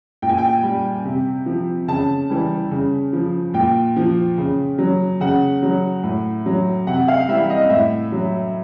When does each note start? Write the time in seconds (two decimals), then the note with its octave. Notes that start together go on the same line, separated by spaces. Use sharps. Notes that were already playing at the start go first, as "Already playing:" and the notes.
0.22 A#2 G5
0.29 G#5
0.38 G5
0.63 G3
1.05 C3
1.46 F3
1.88 C#3 A5
2.30 E3 G3
2.71 C#3
3.13 F3
3.54 A#2 G5
3.97 F3
4.38 C#3
4.78 F#3
5.21 C#3 F#5
5.63 F#3
6.03 A2
6.46 F#3
6.87 C3 F#5
7.08 F5
7.28 E3 G3 E5
7.50 D#5
7.70 A2 E5
8.12 F#3